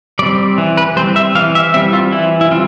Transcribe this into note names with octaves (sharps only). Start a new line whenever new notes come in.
G3 C4 D5
E3
B4
G3 C4 C5
E5
E3 F5
E5
G3 C4 E5
F4
E3 E4
E4
G3 C4 F4